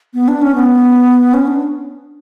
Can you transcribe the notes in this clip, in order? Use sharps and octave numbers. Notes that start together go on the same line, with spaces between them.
B3
D4
C#4
B3
C#4
D4